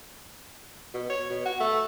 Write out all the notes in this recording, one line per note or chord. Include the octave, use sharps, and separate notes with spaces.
B2
C#5
B2
F#4
A3